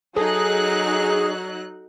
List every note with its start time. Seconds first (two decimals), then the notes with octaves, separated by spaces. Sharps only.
0.16 F#3 D#4 G#4 A4 F#6